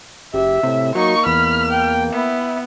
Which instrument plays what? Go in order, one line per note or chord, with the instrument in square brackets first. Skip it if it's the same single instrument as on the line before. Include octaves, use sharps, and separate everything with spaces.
[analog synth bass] F#1 [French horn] G4 [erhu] E5
[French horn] A2 [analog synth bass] C3
[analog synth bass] F#3 [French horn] A#3 [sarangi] D#4 [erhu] C#6
[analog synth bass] E2 [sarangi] B5 [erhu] F6
[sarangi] G5
[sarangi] B3 [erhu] E4